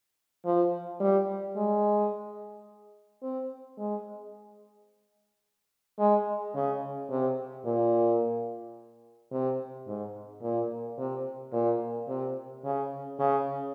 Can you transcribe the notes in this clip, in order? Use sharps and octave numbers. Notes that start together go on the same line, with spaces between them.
F3
G3
G#3
C4
G#3
G#3
C#3
C3
A#2
C3
G#2
A#2
C3
A#2
C3
C#3
C#3